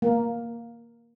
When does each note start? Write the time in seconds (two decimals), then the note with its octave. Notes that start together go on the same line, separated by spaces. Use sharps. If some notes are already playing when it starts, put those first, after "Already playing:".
0.02 A#3